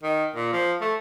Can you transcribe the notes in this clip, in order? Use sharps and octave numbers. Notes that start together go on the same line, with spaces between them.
D#3
A#2
F3
A3